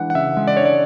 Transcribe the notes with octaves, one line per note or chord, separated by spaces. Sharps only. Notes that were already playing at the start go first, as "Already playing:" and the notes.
Already playing: E3 G#3 D4 F#5
F#5
C#3 E5
G#3
D5
D4 C#5
D5